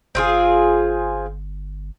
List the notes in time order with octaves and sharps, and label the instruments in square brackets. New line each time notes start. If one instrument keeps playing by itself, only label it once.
[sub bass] G1 [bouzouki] C4 F4 G#4